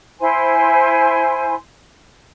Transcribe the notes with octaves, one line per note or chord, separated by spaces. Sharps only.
E4 C5 G#5 C6